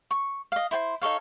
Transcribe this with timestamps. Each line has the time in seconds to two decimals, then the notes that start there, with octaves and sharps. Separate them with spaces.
0.11 C#6
0.52 D#5 F5
0.71 E4 C5 G#5 C6
1.02 D#4 A4 C#5 F5